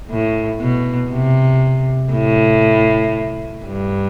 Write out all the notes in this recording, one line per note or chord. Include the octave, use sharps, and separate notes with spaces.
A2
B2
C3
A2
G2